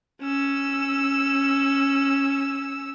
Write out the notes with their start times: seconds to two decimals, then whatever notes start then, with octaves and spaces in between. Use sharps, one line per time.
0.22 C#4 E6